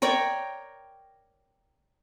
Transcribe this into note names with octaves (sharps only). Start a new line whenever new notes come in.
A#4 C#5 D5 G5